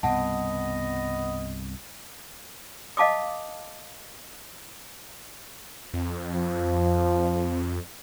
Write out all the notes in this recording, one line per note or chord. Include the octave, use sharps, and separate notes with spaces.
C2 G2 B2 B3 D#5 F#5 A5
D#5 F5 A5 D6 D#6
F2
F3